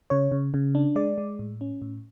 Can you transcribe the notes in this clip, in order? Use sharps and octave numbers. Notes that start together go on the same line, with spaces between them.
C#3 C#5
C#3
C#3
D4
G#3 D5
G#3
A2
C#4
A2